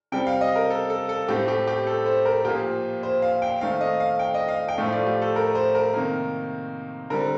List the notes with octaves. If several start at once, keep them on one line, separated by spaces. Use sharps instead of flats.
C3 G3 C4 G5
F5
D#5
A#4
A4
A4
A4
A2 A3 C4 G4
G4
G4
A4
C5
A#4
A#2 F3 A#3 G4
C5
F5
G5
D#3 A3 C4 F5
D#5
F5
G5
D#5
F5
G5
A2 F3 A3 F5
D5
G4
A4
A#4
C5
A#4
C3 D#3 A#3
D3 G3 C4 A#4